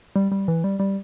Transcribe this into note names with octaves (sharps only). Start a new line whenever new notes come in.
G3
G3
E3
G3
G3